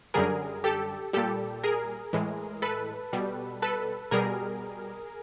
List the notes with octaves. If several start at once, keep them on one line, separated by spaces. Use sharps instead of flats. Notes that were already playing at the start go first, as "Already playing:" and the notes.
F#2 D3 G3 G#4 A#4
G4 A4
A#2 G3 G4 A4
G#4 A#4
A2 E3 G#3
A4 B4
B2 G3
A4 B4
B2 G3 G#4 A#4